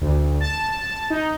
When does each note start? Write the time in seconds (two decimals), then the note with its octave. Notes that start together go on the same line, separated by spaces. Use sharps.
0.01 D2
0.41 A5
1.10 D#4